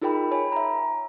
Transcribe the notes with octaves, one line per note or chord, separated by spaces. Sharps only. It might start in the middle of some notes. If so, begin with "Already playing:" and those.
D#4 F4 G#4 A#4 G5 B5
C#5 G#5 B5
E5 A#5